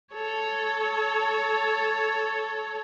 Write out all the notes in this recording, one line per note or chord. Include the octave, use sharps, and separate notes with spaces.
A4 C#5